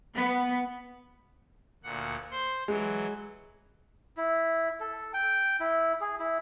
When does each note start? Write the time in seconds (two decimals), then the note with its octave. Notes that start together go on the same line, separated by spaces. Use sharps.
0.15 B3
1.84 D2 A#2 F#5
2.31 C5 C6
2.68 E3 F#3 G#3
4.17 E4
4.80 A4
5.14 G5
5.60 E4
6.01 G#4
6.20 E4